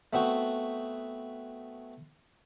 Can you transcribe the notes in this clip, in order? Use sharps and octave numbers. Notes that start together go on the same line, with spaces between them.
A3 B3 C4 F#4